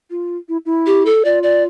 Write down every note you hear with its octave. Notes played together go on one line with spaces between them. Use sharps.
F4
E4
E4
G4
A4
F4 D5
D5